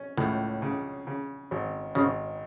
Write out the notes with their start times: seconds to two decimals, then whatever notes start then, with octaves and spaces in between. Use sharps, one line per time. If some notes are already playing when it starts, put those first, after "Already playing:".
Already playing: C#4
0.17 C#2 A2
0.62 C#3
1.07 C#3
1.51 G#1
1.95 G#1 C#3